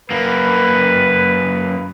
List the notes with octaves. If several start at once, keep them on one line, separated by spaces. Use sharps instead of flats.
F#2 A#3 B4